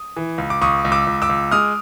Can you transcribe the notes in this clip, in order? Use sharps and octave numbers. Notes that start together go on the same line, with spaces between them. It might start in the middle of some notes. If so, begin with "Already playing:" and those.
Already playing: D#6
E3
C#2
D6
C#2 C#6 D#6
C#2
D6 E6
C#2
D6 E6
C#2
G#3 D#6 F6